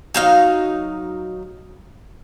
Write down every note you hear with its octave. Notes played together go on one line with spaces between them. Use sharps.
F#3 D#4 F5